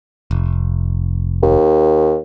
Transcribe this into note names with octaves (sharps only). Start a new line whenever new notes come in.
F1
D#2